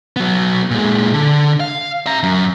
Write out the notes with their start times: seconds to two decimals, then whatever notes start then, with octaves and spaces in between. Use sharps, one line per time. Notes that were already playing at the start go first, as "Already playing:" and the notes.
0.16 F#3 B3
0.71 A#2 G#3
1.14 D3
1.60 F5
2.06 E5 A#5
2.23 F#2